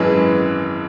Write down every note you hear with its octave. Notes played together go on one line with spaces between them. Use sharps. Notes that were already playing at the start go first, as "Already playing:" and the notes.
Already playing: G#1 F#2 E3 G#3 B4